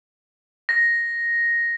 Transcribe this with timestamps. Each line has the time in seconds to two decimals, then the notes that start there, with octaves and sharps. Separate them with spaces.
0.69 A#6